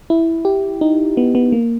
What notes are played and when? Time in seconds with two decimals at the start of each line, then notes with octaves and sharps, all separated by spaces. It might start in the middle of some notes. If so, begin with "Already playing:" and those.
0.10 E4
0.45 G4
0.81 D#4
1.17 B3
1.35 B3
1.52 A#3